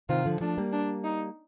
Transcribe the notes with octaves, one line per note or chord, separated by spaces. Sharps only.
C3 D#3 F4
D3 F3
F3 A3 D4
G3 A#3
D4
D#4